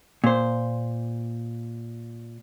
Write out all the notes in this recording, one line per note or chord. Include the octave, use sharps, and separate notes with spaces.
A#2 C5